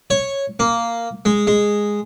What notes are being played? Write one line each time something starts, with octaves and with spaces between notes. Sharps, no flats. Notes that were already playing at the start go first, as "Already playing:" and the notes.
C#5
A#3
G#3
G#3